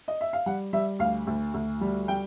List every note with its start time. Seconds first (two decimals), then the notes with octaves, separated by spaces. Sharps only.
0.08 D#5
0.21 E5
0.33 F5
0.46 G3 F#5
0.73 G3 E5
0.99 D2 F5
1.27 D2
1.54 D2
1.81 G3
2.08 G3 G5